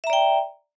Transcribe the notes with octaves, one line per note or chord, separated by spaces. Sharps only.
D5 E5 G5 A#5